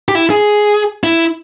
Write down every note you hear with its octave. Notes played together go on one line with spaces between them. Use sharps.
G4
E4
G#4
E4